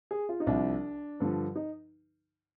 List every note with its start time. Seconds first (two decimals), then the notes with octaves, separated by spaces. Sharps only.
0.11 G#4
0.29 F4
0.40 D#4
0.47 C2 C3 F3 D4
1.20 G2 D3 F3
1.56 D#4